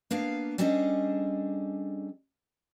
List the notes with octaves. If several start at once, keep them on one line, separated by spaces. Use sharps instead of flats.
A#3 B3 D4 F5
G3 C#4 D4 G#4 A4 D#5